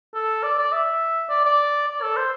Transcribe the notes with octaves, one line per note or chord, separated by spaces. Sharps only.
A4
D5
D5
E5
D5
D5
D5
A4
C5